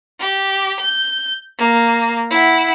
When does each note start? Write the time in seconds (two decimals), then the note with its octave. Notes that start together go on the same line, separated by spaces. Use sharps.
0.19 G4
0.80 G6
1.58 A#3
2.30 E4 F#5